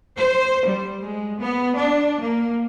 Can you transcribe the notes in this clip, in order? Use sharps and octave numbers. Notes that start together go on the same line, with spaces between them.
C5
G3
G#3
B3
D4
A#3